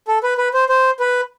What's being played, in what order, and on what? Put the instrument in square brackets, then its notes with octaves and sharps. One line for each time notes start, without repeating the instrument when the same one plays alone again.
[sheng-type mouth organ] A4
B4
B4
C5
C5
B4